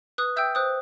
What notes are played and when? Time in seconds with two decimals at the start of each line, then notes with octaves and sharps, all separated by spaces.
0.18 B4 D#6 F#6
0.36 E5 G5 E6 G6
0.55 C5 D#6 F#6